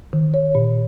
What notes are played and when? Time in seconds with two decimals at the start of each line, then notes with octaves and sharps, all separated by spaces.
0.13 D#3
0.34 C#5
0.55 A#2